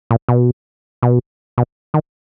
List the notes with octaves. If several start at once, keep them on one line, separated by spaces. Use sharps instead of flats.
A#2
B2
B2
B2
D#3